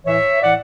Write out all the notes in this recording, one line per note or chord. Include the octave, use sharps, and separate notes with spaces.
A2 E3 C#5 E5
A2 E3 D5 F#5